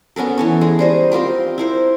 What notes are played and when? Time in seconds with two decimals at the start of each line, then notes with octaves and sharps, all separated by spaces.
0.16 B3 C#4 A4 A#4
0.38 E3 A4 C#5
0.61 G#3
0.79 G3 C5 D#5
1.12 C4 F4 G4 A#4
1.58 E4 A#4 C5